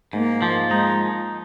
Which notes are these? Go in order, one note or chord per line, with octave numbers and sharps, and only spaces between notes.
G#2 A#3
F3
G#3 D#4